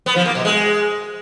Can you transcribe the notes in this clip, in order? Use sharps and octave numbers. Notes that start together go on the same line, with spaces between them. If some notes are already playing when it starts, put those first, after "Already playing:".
B3
F3
A#3
B2
G#3